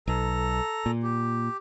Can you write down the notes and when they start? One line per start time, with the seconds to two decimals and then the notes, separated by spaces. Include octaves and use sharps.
0.08 B1 A4 A#5
0.86 A#2
1.03 G4